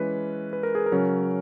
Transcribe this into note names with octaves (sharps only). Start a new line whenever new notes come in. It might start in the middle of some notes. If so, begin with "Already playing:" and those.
Already playing: E3 G#3 C#4 B4
B4
A#4
G#4
A#4
C#3 F#3 C#4